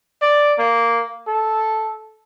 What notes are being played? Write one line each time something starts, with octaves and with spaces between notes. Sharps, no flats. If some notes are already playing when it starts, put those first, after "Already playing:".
D5
A#3
A4